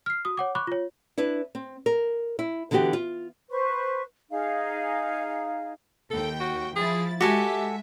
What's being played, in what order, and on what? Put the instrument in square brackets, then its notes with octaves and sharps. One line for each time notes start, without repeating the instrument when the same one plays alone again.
[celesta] F6 C7
F#4 D#6
C#5 F#5 D6
B5 C#6 D6 F#6
F4 C#5
[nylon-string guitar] D4 E4 B4
C4
A#4
E4
D3 E3 B3 F#4 G4
F4
[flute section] B4 C5 C#6
D#4 G#4 F5
[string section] D#2 G5 [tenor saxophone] A4
[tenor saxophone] F#4
[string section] F3 E4 A6 [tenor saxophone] G#4
[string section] G#3 E5 [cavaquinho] F#4 A4 G#5 [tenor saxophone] G4